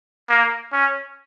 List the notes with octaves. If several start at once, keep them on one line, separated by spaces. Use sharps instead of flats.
A#3
C#4